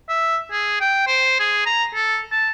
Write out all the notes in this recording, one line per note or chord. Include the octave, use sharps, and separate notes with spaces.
E5
G#4
G5
C5
G#4
A#5
A4
A5